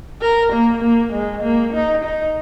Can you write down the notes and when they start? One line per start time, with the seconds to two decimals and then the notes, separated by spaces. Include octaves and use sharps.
0.22 A#4
0.53 A#3
0.82 A#3
1.13 G#3
1.43 A#3
1.73 D#4
2.04 D#4